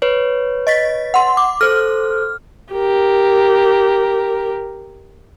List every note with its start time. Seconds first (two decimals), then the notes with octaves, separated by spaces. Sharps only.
0.02 B4 C#5
0.67 D#5 A6 B6
1.14 F#5 C6
1.37 D6
1.61 A4 C5 F6
2.73 G4 A#4